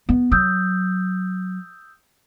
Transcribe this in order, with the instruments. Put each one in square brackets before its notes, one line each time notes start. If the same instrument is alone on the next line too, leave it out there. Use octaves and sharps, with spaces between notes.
[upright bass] B3
[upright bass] F#3 [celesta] D#6 E6 G6